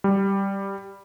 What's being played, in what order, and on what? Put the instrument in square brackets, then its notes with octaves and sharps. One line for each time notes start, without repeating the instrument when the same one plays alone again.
[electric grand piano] G3